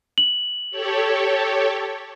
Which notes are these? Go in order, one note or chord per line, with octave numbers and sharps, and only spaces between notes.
F#7
G4 A4 C#5